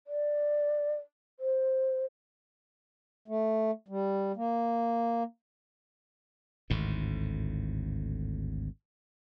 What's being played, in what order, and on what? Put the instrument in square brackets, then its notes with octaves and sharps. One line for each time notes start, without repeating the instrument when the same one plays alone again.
[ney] D5
C5
[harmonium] A3
G3
A#3
[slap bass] G#1 D2 A2